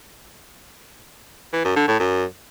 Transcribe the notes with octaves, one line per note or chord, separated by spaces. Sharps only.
E3
F#2
D3
A2
F#2